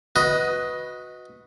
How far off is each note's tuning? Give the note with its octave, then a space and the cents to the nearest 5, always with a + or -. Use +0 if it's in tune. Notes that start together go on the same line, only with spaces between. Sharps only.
F#4 -15 B4 +0 D#5 +10